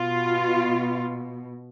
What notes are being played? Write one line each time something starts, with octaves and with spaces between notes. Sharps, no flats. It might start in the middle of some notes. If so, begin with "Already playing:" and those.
Already playing: B2 F4